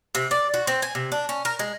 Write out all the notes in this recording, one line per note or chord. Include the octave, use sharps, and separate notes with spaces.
C3
D5
F#4
C4
G#5
C3
D4
C#4
A#4
G#3